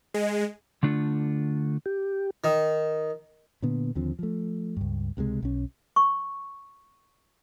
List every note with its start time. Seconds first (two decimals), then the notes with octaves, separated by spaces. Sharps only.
0.14 G#3
0.83 D3 A3 D4 F4 A4
1.86 G4
2.44 D#3
3.62 A#2 D3 B3
3.95 D#2 D3 F3 C4
4.19 F3 A3
4.77 C#2 G2
5.17 C#2 C3 D#3 G#3
5.43 B1 C#4
5.96 C#6